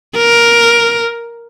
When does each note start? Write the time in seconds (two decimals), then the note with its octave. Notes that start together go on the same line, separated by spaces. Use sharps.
0.17 A#4